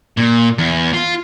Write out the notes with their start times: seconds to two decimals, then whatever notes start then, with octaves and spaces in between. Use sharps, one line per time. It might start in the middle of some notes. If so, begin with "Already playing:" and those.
0.17 A#2
0.58 E2
0.93 F4